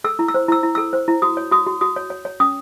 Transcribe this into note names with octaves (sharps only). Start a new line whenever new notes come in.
A4 E6
E4
E6
C5
E4 E6
E4
A4 E6
C5
E4
F#4 D#6
C#5
F#4 D#6
F#4
F#4 D#6
C#5
C#5
C#5
C#4 D#6